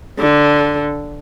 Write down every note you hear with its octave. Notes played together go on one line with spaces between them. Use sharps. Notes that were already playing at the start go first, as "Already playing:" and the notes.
D3